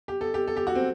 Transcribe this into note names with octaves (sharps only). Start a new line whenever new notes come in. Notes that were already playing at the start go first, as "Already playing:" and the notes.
G4
A4
G4
A4
G4
F#4
C4